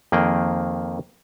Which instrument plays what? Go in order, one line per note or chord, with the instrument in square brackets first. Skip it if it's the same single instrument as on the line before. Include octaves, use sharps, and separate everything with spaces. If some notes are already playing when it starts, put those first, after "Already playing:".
[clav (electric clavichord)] F2 D#3 A#3 G#4 G5